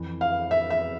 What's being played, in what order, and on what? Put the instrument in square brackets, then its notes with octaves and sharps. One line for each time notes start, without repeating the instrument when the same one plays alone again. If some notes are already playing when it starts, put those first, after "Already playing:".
Already playing: [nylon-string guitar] F2 E3
[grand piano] F5
E5
E5